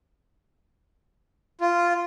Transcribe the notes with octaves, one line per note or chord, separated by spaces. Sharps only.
F4